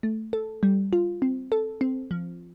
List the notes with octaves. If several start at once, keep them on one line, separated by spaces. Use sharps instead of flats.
A3
A4
G3
F4
C4
A4
C4
F3